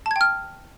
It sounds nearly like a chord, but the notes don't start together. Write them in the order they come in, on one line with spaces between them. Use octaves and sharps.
A5 G#6 G5 F6